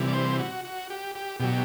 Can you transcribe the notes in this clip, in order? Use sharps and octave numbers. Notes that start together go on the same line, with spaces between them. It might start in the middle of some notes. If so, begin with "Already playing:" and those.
Already playing: C3 E3 G3
D5
C5
F#4
F#4
G4
G4
B2 F#3 G4